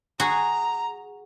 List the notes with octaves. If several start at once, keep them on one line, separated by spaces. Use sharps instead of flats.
F#4 G#4 A#5